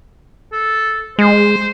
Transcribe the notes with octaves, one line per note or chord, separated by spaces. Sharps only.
A4
G#3 C5